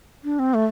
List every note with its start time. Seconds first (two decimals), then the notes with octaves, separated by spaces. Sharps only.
0.24 D4
0.39 C4
0.54 A3